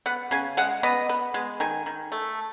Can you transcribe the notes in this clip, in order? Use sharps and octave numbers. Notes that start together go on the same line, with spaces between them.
B3 F#5
C#3 G#5
G#3 F#5
B3 D#5
B3
G#3
D#3 G#5
D#3
A3